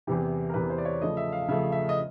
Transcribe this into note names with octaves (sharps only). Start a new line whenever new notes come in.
E2 C3 E3 G4
A#4
E2 C3 E3 B4
C5
D5
C#5
C#3 F3 A3 D#5
E5
F5
C#3 F3 A3 E5
E5
D#5